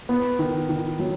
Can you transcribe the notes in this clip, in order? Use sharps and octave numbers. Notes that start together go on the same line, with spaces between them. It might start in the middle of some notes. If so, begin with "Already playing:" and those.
B3
D#3
D#3
F#3